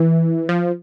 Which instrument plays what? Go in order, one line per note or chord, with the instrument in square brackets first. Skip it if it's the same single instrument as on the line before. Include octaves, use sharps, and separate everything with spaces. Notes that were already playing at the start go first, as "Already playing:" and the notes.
Already playing: [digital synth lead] E3
F3